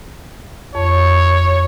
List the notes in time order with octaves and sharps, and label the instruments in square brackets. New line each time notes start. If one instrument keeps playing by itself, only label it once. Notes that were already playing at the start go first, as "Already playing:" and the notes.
[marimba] F2 [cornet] C#5